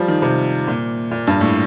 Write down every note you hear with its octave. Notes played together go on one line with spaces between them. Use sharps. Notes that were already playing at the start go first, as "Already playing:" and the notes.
Already playing: F3 G3
D#3
C3
A#2
A#2
G2
A2